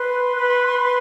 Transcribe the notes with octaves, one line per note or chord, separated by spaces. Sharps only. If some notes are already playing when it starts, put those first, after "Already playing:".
Already playing: B4 C6
B4
B4